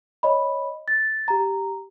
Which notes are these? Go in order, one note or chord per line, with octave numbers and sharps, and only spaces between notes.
C#5 D#5 B5
A6
G4 A#5